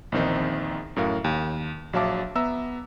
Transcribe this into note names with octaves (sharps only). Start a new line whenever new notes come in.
A#1 E2 D#3 C4 D#4
F#2 A2 A#4 F5
D#2
A#1 F#3 E5 F5 A5 D6
B3 E5 A#5 E6